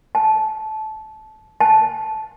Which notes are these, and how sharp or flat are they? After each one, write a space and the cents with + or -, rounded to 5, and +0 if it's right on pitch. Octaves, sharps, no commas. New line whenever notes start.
A5 -20
A5 -15